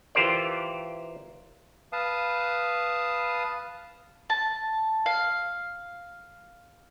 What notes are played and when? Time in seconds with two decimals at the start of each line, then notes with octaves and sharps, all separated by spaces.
0.15 E3 F4 G4 A#4 C5 D5
1.93 B4 F5 A5 D#6
4.30 A5
5.06 F5